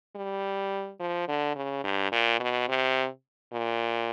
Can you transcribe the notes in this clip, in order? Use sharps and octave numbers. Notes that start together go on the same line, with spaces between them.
G3
F3
D3
C#3
G2
A#2
B2
C3
A#2